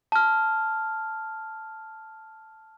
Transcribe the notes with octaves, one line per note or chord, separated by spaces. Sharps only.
A5 F6